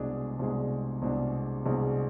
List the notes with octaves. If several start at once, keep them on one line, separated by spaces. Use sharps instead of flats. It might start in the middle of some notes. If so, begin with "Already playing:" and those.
Already playing: C2 B2 G#3 D4 G#4
C2 B2 G#3 D4 G#4
C2 B2 G#3 D4 G#4
C2 B2 G#3 D4 G#4